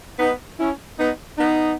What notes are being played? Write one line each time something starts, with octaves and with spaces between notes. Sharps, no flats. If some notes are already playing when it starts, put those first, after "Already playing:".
B3 D#4
C#4 E4
B3 D#4
B3 D#4